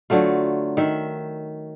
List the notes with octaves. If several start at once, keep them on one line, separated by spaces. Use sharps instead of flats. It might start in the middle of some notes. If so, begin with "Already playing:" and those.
D3 F#3 A3 F4
D#3 E5